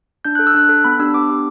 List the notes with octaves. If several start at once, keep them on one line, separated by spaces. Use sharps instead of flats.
D4 G6
A4 F#6
E6
D4 F#6
A4
B3 B5
D4 G4 E6
B3 D6
D4 G4